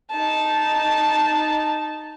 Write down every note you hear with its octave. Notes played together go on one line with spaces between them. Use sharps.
D#4 A5